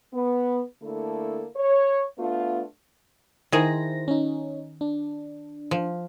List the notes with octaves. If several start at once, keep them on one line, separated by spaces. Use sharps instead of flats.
B3
D3 A3 A#3 E4 A4
C#5
A3 B3 D4 F4
D#3 E4 G#4 C5 A#6
C#4 D#4
D4
F3